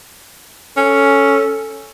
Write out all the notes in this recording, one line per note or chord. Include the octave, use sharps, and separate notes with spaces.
C#4 A4